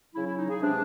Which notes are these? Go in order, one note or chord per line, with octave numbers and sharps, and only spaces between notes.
C#3 F#3 E4
E4
D#4
G#4
C3 E3 G#3 D4